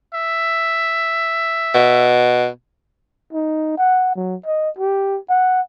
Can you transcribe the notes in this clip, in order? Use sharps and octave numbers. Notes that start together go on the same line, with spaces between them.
E5
B2
D#4
F#5
F#3
D#5
G4
F#5